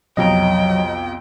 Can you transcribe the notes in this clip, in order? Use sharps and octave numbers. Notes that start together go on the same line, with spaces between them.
B1 F2 C3 F#3 D#5 G5 A#5